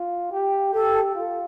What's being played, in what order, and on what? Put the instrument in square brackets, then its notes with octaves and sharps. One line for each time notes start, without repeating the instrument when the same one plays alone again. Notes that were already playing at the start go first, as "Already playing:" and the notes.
Already playing: [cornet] F4
G4
[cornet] G4 [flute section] A4
[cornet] F4